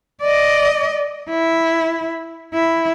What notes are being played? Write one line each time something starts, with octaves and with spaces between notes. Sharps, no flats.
D5 D#5
E4
E4